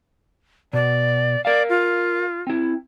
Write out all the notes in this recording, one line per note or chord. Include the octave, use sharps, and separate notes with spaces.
B2 D5
A#4 D5 E5 F5
F4
C4 E4